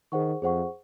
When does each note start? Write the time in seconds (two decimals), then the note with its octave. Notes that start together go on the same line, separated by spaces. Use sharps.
0.12 D#3 G#4 C5 F#5 C#6
0.42 F2 G#4 C5 F#5 C#6